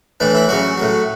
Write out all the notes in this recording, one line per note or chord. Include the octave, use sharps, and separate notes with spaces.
A2 E3 D4
E4
C#3 F#3 F#4
A2 F#3